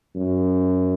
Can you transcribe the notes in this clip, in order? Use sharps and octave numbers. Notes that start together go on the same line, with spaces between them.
F#2